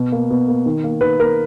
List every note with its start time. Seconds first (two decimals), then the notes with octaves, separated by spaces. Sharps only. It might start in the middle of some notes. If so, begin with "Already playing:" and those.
Already playing: B2
0.12 A#3
0.30 B2
0.48 A#3
0.66 D#3
0.84 A#3
1.01 D#3 B4
1.19 A#3 A#4